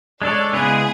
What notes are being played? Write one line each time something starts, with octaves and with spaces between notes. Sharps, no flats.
G#3 D4 A4 C#5 D5
C#3 G#3 B3 E4 G#4